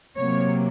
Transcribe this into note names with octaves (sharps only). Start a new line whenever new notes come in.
C3 F#3 A#3 C#5